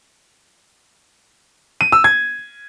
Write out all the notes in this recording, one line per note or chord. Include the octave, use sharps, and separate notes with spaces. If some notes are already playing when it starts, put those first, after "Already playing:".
D#7
E6
G#6